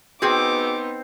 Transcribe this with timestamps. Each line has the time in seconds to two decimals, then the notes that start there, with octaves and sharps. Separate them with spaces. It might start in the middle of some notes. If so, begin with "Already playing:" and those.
0.22 B3 C4 D#4 F#4 G#4 C5 G5 D6